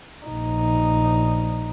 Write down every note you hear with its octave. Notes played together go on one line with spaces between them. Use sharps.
A#1 D#4